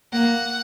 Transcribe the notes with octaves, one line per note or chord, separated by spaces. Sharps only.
A#3 F#5